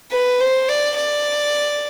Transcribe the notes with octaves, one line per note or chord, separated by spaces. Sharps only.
B4
C5
D5
D5